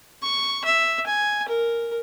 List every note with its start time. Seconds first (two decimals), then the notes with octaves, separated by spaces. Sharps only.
0.23 C#6
0.65 E5
1.07 G#5
1.48 A#4